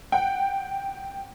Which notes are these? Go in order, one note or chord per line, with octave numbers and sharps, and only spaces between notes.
F#5 G5